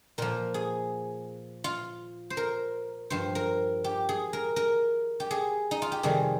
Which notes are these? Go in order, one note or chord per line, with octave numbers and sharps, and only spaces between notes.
A#2 F3 A#4
G#4
F4
C5
A#4
G2 F3 C5
A#4
G4
G#4
A#4
A#4
G4
G#4
D#4
F4
G4
F2 C3 D#3 G3 G#4